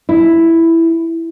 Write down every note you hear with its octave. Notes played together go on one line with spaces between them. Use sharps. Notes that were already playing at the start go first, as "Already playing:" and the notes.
E4